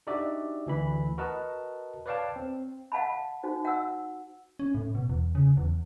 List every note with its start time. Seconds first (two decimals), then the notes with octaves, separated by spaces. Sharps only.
0.07 D4 D#4 F#4 G4 D5 E5
0.66 D2 E3 B5
1.18 F#4 A#4 B4 D#5 A5
2.06 B4 C#5 D5 F5 G5 A5
2.36 C4
2.92 F5 F#5 A5 B5
3.43 D#4 F#4 C5
3.65 F#5 E6
4.59 C#4
4.75 A2
4.95 B2
5.09 E2
5.35 C#3
5.57 E2